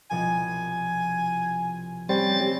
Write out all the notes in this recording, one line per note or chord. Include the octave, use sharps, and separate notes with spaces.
C2 B2 F3 G#5
G3 C4 C#4 C#5 G#5 A6